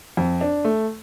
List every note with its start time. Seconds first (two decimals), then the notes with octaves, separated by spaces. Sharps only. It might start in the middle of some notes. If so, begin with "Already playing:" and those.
0.17 F2
0.41 D4
0.65 A3